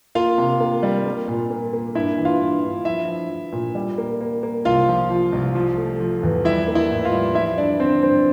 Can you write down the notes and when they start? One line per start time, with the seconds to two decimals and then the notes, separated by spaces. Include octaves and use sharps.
0.15 A#3 F4 F5
0.38 C3
0.60 A#3
0.83 G3
1.06 A#3
1.28 A#2
1.50 A#3
1.73 A#3
1.95 G2 E4 E5
2.18 E3
2.25 F4 F5
2.40 G2
2.63 G2
2.85 F3 E4 E5
3.08 F3
3.30 F3
3.53 A#2
3.75 G3
3.98 A#3
4.21 A#3
4.43 A#3
4.65 C2 F4 F5
4.88 F3
5.11 F3
5.32 C2
5.55 F3
5.78 A3
6.00 F3
6.23 E2
6.45 G3 E4 E5
6.68 A#3
6.75 E4 E5
6.90 A2
7.05 F4 F5
7.13 G3
7.35 F3 E4 E5
7.57 G2 D4 D5
7.80 D3 C4 C5
8.03 G2 C4 C5